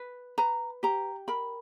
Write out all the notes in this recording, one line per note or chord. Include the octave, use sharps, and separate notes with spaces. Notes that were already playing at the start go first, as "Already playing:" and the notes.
Already playing: B4
B4 A#5
G4 A#5
A#4 B5